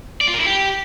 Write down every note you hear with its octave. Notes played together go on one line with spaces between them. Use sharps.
D5
F4
A#4
E4
G4